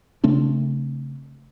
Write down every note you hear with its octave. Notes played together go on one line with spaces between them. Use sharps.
C#3 A3 C4 D4